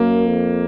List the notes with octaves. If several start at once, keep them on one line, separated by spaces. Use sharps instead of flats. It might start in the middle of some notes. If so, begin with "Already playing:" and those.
Already playing: F#2 A#3
F2